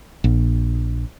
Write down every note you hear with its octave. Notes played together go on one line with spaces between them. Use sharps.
A#1